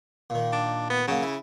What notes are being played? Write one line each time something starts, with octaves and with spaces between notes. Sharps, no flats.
A#2 D#3
D4
B3
C#3 F#3 A#3
E4